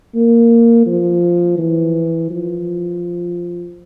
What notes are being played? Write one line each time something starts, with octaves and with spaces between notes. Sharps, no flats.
A#3
F3
E3
F3